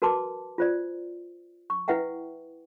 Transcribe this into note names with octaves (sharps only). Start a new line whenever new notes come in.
F#4 A#4 B4 A5 C6 D6
F4 C5 D5
C#6
E4 B4 E5 F#5 G5